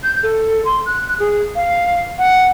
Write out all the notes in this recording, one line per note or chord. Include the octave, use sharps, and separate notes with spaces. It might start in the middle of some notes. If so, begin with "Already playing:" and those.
G6
A4
C6
F#6
G#4
F5
F#5